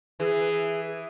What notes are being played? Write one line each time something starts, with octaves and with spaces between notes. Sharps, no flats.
E3 G#4